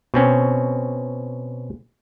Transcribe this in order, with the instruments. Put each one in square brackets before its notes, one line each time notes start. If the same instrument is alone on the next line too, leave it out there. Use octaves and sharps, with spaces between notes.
[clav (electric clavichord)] B2 C4 C#4